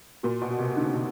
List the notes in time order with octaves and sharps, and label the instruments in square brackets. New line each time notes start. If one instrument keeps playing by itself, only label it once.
[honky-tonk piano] A#2 [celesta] F#4
[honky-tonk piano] B2
[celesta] F#4
[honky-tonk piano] C3
[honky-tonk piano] D3 [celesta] D#4
[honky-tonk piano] C#3
C3